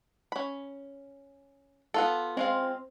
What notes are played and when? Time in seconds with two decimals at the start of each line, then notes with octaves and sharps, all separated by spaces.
0.32 C#4 B5
1.94 B3 F4 A4
2.37 G#3 C4 F4 F5